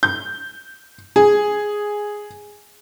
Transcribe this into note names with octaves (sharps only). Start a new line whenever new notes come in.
G6
G#4